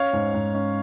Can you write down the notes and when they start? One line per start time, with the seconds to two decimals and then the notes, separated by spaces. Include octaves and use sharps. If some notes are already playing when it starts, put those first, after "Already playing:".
Already playing: C#4 C#5 F5
0.13 G#2
0.34 G#2
0.54 C#4